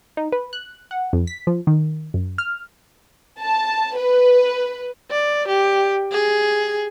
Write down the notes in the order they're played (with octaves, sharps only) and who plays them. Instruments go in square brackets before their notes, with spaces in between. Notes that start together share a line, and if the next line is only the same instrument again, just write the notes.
[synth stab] D#4
B4
F#6
F#5
F2
B6
F3
D#3
F#2
F6
[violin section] A5
B4
[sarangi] D5
G4
G#4